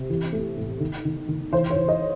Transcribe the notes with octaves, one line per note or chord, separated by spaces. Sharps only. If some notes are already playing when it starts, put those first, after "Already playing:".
Already playing: C3
E3
A3
A2
D#3
D#3
D#3
E3 C5
C#5
E3
D#5